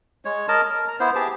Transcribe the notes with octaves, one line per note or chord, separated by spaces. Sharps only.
G#3 C#5
A#4 D#5 A5
A#4
A#5
B3 E4 C5
G4 G#4 A5